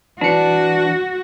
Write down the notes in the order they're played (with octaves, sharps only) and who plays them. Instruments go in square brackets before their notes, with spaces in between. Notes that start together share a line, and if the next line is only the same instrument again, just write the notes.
[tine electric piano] E3 C#7 [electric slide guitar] D4 [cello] F#4